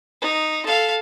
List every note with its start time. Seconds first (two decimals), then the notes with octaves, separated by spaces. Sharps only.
0.22 D#4
0.66 A4 F5